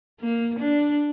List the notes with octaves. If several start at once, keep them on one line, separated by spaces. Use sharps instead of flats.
A#3
D4